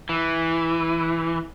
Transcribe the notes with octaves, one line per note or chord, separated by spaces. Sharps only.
E3